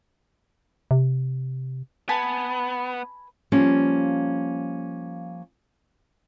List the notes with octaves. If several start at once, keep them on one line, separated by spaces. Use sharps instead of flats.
C3
B3 B4 G#5 A5
F3 G3 A#3 C#4